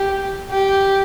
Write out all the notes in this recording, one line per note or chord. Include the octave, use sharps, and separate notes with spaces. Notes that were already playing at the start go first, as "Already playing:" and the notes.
Already playing: G4
G4